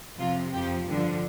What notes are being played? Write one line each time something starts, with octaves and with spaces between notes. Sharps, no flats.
F2 C3 F3 F4
F2 F3 G4
G2 D3 F3